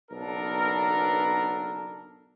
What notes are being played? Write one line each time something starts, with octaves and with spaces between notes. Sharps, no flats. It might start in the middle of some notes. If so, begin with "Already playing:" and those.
F#1 B1 B3 D4 A4 A#4